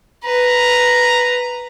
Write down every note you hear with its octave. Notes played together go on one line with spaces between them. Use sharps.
B4 A#5